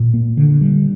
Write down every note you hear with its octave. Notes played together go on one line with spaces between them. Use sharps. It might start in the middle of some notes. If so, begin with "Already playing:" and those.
Already playing: A#2
A#3
D3
G3